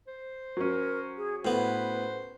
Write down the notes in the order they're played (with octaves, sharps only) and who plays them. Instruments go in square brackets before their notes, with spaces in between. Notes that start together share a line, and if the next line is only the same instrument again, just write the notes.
[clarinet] C5
[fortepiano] F#3 C#4 [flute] A#4
[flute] G#4
[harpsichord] A2 B3 [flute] B4 [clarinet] C5